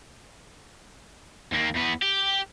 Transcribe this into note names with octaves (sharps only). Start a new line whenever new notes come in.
D#2 A#3
E2 B3
G4